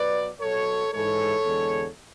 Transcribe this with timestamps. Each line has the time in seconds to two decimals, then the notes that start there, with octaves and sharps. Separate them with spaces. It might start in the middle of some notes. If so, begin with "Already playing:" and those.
Already playing: B2 F#3 B4 D5
0.39 B2 F#3 A4 C#5
0.91 G#2 E3 G#3 A4 C#5
1.45 E2 D3 G#3